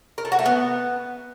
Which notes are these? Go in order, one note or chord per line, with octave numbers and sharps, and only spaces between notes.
A#4
A3
F#4
A3
B3